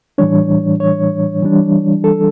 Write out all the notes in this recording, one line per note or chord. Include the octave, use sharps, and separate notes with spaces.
A2 E3 G3 D4 C#5
C#5
E3 G3 D4
A4